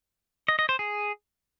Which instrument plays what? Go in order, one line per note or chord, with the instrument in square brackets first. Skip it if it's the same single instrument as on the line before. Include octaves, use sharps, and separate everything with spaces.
[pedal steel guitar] D#5
D#5
C5
G#4